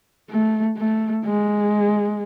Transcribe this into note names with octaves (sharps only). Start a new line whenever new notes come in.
A3
A3
G#3